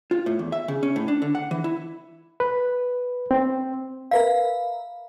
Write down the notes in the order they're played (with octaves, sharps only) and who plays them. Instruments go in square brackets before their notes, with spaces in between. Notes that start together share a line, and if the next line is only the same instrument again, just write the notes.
[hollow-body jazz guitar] F4
A2
E2
E5
C#3
C#4
A2
D4
D3
F#5
E3
E4
[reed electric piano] B4
C4
[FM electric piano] A#4 B4 E5 [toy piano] F5